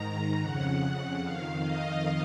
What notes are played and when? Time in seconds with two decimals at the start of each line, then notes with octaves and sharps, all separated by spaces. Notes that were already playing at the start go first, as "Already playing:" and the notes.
Already playing: G#2 D#3 A#5
0.40 F2 C#3 F#5
1.22 F2 D#3 F5
1.63 D#5